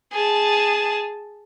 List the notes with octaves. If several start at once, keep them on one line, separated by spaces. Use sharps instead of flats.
G#4 A5